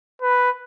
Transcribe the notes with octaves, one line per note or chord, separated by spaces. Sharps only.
B4